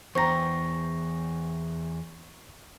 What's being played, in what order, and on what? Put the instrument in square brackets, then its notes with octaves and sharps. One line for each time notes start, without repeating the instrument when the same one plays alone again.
[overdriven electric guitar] E2 [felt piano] C5 G5 A#5 [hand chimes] C#6 A#6